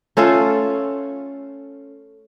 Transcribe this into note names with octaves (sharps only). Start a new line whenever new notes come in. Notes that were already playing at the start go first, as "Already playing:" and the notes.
A3 C#4 F4 A4